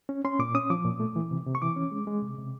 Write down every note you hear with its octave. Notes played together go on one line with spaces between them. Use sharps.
C#4
C#4 C6
A#2 D6
C#4 D#6
F3 D6
A#2
A3
E3
C3
C3
C#6
E3 D6
C#4
G#3
G#3
C3
C3